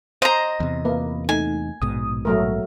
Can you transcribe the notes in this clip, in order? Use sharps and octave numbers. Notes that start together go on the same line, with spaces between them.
C5 D#5 A#5
E2 C3
A#3 B4
A3 D#4 G#5
A#1 G#2 B2 D#6
F#3 A3 A#4